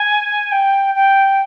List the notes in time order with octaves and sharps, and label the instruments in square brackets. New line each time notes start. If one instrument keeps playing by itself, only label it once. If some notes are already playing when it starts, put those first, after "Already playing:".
Already playing: [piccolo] G#5
G5
G5